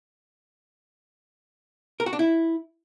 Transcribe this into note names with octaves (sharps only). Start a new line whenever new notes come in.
A#4
F#4
D4
E4